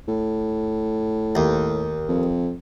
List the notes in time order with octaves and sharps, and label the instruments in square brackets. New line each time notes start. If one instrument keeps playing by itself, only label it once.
[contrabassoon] A2
[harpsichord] D#2
[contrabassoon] F2